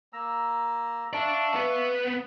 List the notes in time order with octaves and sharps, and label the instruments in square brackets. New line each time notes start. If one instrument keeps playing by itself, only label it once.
[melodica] A#3 A#5 E6
[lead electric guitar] D5 A5 [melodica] E5 F5 C#6
[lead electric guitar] B3 B4